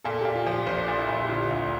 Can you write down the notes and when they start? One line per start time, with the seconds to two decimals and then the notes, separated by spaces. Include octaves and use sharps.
0.04 A#2 A4
0.21 A#2 G4
0.35 F4
0.47 F3 G4
0.67 A#1 C5
0.83 D5
0.88 A#2
0.98 E4
1.09 A#1
1.14 E4
1.24 G4
1.29 D3 F4
1.50 D2